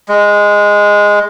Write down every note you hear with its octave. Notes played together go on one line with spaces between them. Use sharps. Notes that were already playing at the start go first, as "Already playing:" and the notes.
G#3